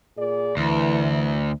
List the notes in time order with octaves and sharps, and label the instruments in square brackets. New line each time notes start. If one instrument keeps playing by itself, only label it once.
[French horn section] A#2 G#4 D5
[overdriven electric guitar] D2 [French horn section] E3